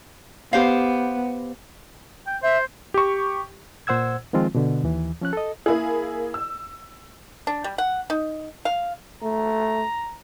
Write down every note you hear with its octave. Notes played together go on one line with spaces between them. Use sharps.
B3 G4 C5 F5
G5
C5 E5
G4 C#6
A#2 C5 F#5 E6 G#6
D#3 F3 G#3 C4 F4
B2 D3
D#2 E3
F3 C#4 F#6
A4 D#5
A#3 E4 G#4
E6
D4
G3
F#5
D#4
F5
A3 A#5